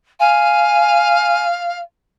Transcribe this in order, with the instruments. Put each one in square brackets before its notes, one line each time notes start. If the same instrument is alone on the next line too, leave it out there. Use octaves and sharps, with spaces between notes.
[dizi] F5 [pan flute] G#5